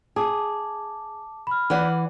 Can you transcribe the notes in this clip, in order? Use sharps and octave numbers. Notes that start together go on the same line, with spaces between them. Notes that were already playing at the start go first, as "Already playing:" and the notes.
G#4 A5 D6
B5 F6
E3 D5 F#5